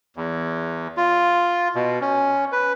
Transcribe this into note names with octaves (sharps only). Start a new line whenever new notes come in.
E2
F4
B2
C#4
B4